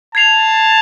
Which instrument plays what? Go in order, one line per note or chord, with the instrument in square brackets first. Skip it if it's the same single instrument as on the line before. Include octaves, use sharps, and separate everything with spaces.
[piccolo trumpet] A5 [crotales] G#6 C7 F7